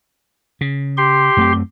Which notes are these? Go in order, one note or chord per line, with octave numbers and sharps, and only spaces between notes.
C#3
G4 C6
F#2 A3 C4